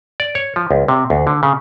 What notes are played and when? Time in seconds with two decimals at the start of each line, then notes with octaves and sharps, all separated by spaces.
0.20 D5
0.35 C#5
0.56 F3
0.71 C#2
0.88 C3
1.10 D2
1.27 D3
1.43 C#3